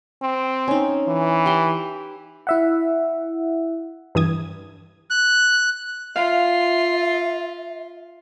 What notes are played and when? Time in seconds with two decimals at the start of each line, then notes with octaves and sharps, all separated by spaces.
0.22 C4
0.68 C#4 D#4
1.08 E3
1.46 G4 C6
2.47 E4 E5 F#5
4.15 G2 E3 D#6 G#6
5.10 F#6
6.16 F4 E5 F5